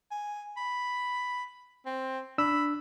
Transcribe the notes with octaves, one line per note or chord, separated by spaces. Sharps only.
G#5
B5
C4
D4 B5 E6